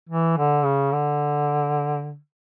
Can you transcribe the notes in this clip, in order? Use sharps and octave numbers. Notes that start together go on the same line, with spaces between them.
E3
D3
C#3
D3